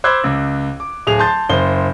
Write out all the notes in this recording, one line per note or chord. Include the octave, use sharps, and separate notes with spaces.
C5 B5 D6 E6 F#6 G#6
C#2
D6
D1 G#4 F7
A5 C6 G6 A6
F#1 C5 G7